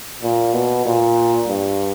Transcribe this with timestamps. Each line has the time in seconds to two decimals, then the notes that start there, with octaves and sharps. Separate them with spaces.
0.23 A#2
0.54 B2
0.86 A#2
1.48 G2